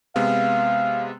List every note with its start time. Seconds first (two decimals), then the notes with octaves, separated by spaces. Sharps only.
0.16 C3 G#3 B3 F5